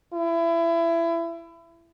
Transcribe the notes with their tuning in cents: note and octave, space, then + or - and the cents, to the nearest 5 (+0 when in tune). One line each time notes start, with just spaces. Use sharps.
E4 +25